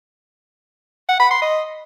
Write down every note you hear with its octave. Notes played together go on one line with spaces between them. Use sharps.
F#5
B5
C6
D#5